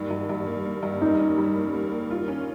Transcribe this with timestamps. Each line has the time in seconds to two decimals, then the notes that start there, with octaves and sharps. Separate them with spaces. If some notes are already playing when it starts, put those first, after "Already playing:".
Already playing: G2 A#3 D#4
0.10 G2
0.29 G2
0.47 A#3
0.66 A#3
0.83 G2
1.01 A#3 D#4
1.19 C#4
1.38 G3
1.56 A#3
1.74 A#3
1.91 A#3
2.10 F4
2.28 C#4